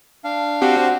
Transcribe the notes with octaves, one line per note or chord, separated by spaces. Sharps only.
D4 F5
C4 F#4 G4